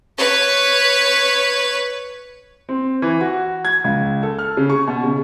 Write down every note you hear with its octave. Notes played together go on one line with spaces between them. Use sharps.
B4 C#5
C4
E3
F#4
G#6
C#2
A4
F6
C#3
C#6
B2
C#3